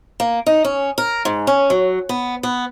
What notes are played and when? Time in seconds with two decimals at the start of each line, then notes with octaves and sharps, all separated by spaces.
0.20 A#3
0.46 D#4
0.65 C#4
0.98 A#4
1.25 G#2
1.47 C#4
1.70 F#3
2.09 B3
2.43 B3